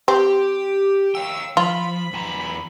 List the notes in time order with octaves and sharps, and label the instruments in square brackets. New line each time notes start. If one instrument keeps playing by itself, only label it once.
[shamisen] C4 [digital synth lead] G4
[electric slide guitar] C#5 F5 G5 [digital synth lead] E6
[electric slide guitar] F3 [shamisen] F4 [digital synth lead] B5
[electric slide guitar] E2 G#5 A#5